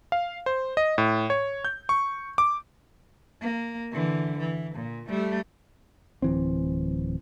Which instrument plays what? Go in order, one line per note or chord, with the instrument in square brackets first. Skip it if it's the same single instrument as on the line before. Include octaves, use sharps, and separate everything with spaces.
[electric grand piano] F5
C5
D#5
A2
C#5
G6
C#6
D6
[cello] A#3
D3 E3
E3
A#2
G3 A3
[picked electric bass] D1 E3 C4